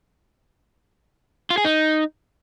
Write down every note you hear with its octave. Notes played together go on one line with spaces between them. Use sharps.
F4
G#4
D#4